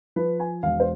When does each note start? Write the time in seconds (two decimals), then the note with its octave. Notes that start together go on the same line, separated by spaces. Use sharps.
0.16 F3 B4
0.40 G#5
0.63 E1 F5
0.80 C5